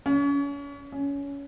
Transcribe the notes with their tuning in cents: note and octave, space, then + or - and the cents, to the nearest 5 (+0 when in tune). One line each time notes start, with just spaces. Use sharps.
C#4 +35
C#4 +20